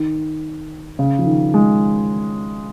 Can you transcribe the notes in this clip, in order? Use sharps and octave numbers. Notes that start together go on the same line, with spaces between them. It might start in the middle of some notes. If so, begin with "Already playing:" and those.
Already playing: D#3
C#3
F3
D#3
G#3